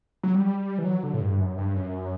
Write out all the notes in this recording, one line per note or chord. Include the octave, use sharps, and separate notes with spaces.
F#3
G3
E3
F#3
D3
A2
G2
F#2
G2
F#2